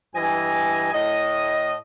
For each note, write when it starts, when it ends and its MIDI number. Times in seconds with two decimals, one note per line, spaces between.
0.14 0.92 43
0.14 0.92 52
0.14 0.92 75
0.14 0.92 80
0.93 1.74 45
0.93 1.74 75